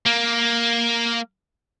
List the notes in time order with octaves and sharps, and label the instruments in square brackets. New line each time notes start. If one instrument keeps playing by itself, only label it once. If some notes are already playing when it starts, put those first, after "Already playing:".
[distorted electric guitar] A#3